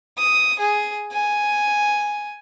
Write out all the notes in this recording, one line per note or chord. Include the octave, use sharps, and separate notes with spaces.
D#6
G#4
G#5